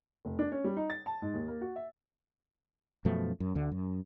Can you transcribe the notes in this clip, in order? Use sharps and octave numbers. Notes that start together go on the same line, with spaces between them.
F1
D4
C#4
G3
D#4
A6
A5
G#2
D#2
A#3
F#4
E5
F#2 B2 F3 A3
F#2
D2 D3
F#2